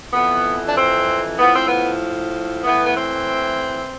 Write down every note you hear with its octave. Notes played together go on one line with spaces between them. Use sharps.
F2 E3 B3
D4
C4
A2 F3 B3
C4
B3
A2 E3 B3
B3
C4